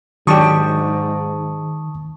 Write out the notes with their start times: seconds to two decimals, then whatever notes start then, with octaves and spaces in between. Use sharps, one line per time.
0.27 G#2 D#3 F#3 D4 G4 A5 C#6 D#6